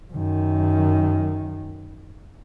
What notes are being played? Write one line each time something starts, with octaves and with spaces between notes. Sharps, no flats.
F#2 D#3